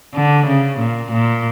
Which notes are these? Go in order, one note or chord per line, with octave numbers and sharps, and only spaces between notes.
D3
C#3
A#2
A#2